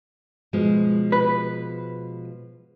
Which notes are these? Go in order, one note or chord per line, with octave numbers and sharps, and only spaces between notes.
B2 F3 G#3
B4